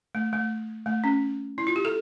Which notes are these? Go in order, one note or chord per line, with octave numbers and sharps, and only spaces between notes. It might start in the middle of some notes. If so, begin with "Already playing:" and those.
A3
A3
A3
C#4
E4
F4
G4
A4